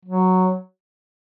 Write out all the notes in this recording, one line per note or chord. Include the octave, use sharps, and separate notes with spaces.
F#3